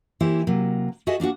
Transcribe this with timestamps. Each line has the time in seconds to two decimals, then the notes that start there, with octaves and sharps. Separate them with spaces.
0.20 E3 A#3 E4 G4 C5
0.47 C3 F#3 A#3
1.07 F#4 G#4 A4 D#5 E5
1.20 A#3 D4 D#4 F#4